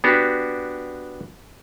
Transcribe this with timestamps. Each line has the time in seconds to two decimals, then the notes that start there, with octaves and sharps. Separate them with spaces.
0.04 B3 D4 F#4 G4